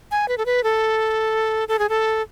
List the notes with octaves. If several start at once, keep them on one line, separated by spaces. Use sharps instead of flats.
G#5
B4
A4
B4
A4
A4
G#4
A4